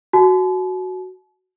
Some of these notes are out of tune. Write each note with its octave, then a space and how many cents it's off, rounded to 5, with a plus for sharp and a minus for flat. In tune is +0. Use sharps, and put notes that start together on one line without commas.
F#4 +0 A5 -45